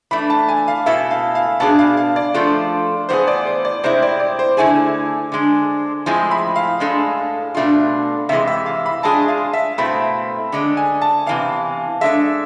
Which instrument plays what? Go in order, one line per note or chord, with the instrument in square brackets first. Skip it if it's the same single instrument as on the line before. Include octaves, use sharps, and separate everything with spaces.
[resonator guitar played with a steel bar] E3 A3 D4 [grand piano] B5
[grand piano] A5
G#5
F5
[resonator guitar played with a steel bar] B2 B3 E4 A4 [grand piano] E5
[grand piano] F5
F5
[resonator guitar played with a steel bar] B2 B3 D4 G#4 [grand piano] A5
[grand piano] F5
F5
D5
[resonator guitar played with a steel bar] F3 A3 D4 F4 A4
[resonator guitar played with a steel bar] A2 E3 B3 F4 G#4 [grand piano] C5
[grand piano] D5
C5
D5
[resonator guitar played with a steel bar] C3 G#3 C4 E4 [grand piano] C5
[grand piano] D5
D5
C5
[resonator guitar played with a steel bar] D3 A3 E4 G#4 [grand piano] G#5
[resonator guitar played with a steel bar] D3 G#3 D4
[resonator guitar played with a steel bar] A2 F3 G#3 C4 E4 [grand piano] G#5
[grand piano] B5
F5
[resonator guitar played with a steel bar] A2 G#3 D4 A4
B2 A3 D4 F4
[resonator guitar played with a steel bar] C3 E3 G#3 [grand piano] E5
[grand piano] E5
F5
B5
[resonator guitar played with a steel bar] G#3 D4 F4 G#4 [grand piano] A5
[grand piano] F5
E5
[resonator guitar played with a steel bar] B2 A3 C4 E4 [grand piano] B5
[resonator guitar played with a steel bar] D3 G#3 D4
[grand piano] G#5
A5
[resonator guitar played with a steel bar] C3 E3 B3 [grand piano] F5
[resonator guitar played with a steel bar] G#3 D4 A4 [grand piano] E5